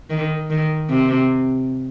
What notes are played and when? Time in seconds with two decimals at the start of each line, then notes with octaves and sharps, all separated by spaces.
0.10 D#3
0.50 D#3
0.90 C3